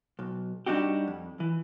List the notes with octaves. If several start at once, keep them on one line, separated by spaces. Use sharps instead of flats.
B1
G3 D4 D#4 F#4 G4
F2
E3